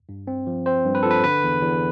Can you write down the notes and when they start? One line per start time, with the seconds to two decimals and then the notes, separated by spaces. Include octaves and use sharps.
0.09 G2
0.27 C4
0.47 F3
0.66 C4 C5
0.86 G2
0.95 B4
1.03 F3 A4
1.11 B4
1.24 D3 B4
1.43 E2
1.62 E2